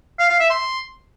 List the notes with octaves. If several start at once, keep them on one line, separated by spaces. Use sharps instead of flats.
F5
F5
E5
C6